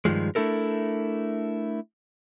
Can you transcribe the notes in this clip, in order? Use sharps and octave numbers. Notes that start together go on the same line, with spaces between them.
G2 D#3 F3 G#3
A3 D4 E4 A4 A#4